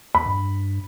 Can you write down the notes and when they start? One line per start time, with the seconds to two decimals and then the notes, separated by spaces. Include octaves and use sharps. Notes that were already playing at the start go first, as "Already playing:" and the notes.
0.15 E2 B5
0.26 G2